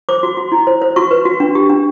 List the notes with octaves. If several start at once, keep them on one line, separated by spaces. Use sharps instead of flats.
C5 D6
F#4
F#4
E4
C5
C5
F#4 C#6
B4
F#4
D4
G4
D4